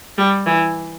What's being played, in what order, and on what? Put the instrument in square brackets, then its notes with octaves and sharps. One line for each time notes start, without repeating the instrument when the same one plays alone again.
[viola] G3
E3